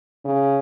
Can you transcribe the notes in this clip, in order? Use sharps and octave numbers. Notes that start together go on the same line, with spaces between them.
C#3